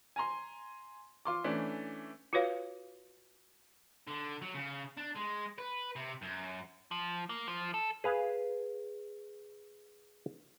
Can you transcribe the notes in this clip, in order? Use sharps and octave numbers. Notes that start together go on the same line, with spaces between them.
G#5 A#5 C6
F4 C6 D6
E3 A3 C#4 D4
F4 F#4 B4 C#5 F5
D3
F#3
C#3
D4
G#3
B4
C3
F#2
F3
A#3
F3
A4
G#4 B4 F5